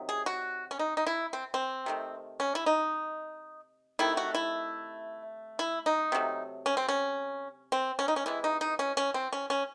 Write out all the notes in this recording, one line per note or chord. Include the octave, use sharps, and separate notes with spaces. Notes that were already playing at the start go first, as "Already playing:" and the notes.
Already playing: C3 D#3 F#3
G#4
F#4
C#4
D#4
D#4
E4
C4
C4
C3 D#3 A3
C#4
E4
D#4
C3 D#3 A3 E4
F#4
E4
E4
D#4
C3 F#3 A3
C#4
C4
C#4
C4
C#4
D#4
C#4
C3 E3 G#3 E4
D#4
D#4
C#4
C#4
C4
C#4
C#4